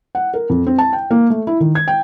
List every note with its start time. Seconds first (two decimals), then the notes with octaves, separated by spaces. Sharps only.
0.15 F#5
0.34 A#4
0.49 F2
0.67 C4
0.78 A5
0.93 G5
1.11 A#3
1.30 A3
1.47 E4
1.60 D#3
1.75 G#6
1.88 G5